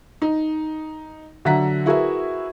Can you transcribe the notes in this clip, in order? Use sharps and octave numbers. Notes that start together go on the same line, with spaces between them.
D#4
D3 F#3 E5 F#5 A#5 B6
E4 F#4 G#4 A#4 B4 E5